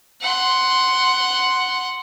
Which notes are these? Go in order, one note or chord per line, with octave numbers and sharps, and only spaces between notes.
F#5 C6